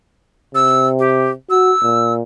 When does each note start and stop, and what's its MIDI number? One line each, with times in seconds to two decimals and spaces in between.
0.55 1.33 48
0.55 0.87 88
0.99 1.31 67
1.50 1.72 66
1.50 2.13 88
1.83 2.22 46